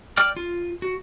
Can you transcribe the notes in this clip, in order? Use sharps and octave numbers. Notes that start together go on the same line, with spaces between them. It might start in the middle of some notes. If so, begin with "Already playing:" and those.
D5 G5 D6 F6
F4
F#4